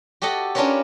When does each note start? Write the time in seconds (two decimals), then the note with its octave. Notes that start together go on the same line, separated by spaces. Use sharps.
0.22 F#4 G4 A4 D#5 F#5
0.55 C#4 D4 F4 A#4 B4 C#5